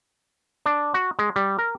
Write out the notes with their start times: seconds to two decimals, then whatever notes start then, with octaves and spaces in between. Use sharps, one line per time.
0.66 D4
0.94 F#4
1.19 G#3
1.36 G3
1.59 A#4